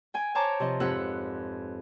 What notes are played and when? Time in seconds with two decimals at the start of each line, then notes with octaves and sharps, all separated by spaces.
0.14 G5 G#5
0.35 C5 C#5 G5 A5 A#5 D6
0.60 C3 F3 D#5
0.80 F2 G#2 G4 B4 F#5 E6